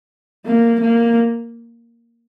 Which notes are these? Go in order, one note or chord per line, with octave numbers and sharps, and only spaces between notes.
A#3
A#3